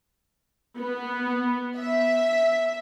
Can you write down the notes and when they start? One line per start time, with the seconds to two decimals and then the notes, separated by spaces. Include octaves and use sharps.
0.76 B3
1.77 E5